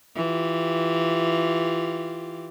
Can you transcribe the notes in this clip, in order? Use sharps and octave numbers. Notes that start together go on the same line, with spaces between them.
E3 F4 G4